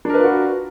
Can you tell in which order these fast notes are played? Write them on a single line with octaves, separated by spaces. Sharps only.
D4 A#4 B4 F4 F#4